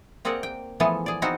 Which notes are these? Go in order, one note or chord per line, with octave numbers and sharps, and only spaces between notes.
A#3 C4 G#4 A#4 D5 F#5
G5
E3 F3 A3 B3 G#4 A5
G#4 D5
B3 C4 D#4 F4 F#4 C5